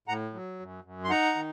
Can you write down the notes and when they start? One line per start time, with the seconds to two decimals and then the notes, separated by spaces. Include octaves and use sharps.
0.08 A2 F#5 A#5
0.34 F#3
0.60 F#2
0.84 F#2
1.04 C6
1.10 D#4 F#5 A#5
1.35 D#3